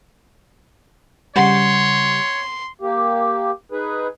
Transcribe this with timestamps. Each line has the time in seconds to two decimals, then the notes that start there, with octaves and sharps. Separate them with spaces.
1.36 C#3 G3 C#5 F#5 C6
2.80 A#3 G4
3.72 D#4 G#4 B4